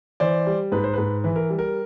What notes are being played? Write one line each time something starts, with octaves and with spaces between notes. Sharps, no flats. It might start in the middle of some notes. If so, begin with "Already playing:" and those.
E3 C5 D5
G3
G#2 B4
C5
G#2 B4
E3 B4
A#4
G3
A#4